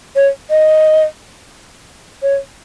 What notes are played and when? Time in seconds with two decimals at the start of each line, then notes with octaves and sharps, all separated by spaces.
0.16 C#5
0.50 D#5
2.22 C#5